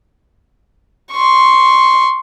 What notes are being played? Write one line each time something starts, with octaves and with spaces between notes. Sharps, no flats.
C6 C#6